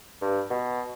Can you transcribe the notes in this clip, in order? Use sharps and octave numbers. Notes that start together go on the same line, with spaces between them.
G2
B2